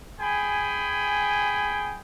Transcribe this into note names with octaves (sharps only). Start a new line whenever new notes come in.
G#4 G5 G#5 B5